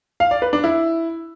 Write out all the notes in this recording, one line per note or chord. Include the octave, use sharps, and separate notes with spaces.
F5
D5
B4
D4
E4